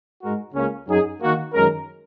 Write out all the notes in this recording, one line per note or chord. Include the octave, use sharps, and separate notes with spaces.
G#2 G#3 F#4 A#4
C#2 C#3 A#3 C#4
F#2 F#3 D#4 G#4
D#3 A#3 F#4
F#2 D#3 G#3 C#4 A#4